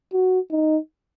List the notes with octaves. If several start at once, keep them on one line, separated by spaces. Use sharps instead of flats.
F#4
D#4